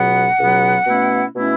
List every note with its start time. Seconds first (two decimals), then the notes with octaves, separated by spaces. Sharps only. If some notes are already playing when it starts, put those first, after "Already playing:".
Already playing: C#2 B2 F#3 B3 F#5
0.38 C#2 B2 F#3 B3
0.86 B2 A3 C#4 E4
1.35 B2 A3 C#4 E4